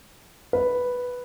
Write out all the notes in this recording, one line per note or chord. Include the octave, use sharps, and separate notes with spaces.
B4